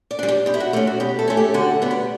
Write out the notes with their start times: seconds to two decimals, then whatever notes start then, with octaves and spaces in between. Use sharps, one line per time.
0.11 D5
0.19 G3 D4
0.28 G4
0.46 B2 G4
0.54 E4
0.60 F#4
0.73 A3 C#4 G4
0.87 F#4
1.00 B2 G4
1.19 A4
1.28 A3 C#4
1.37 G4
1.54 D3 F#4
1.82 G3 B3
1.91 G4